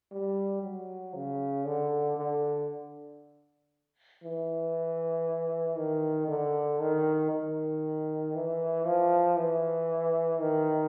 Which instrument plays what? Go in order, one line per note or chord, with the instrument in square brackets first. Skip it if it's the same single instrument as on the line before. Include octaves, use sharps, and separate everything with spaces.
[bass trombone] G3
F#3
C#3
D3
D3
E3
D#3
D3
D#3
D#3
E3
F3
E3
D#3